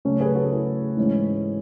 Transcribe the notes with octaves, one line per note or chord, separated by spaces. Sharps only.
C#3 F#3 A3 C#4
G#4 B4
F#4 A4
E4 G#4
G#2 E3 G#3 C#4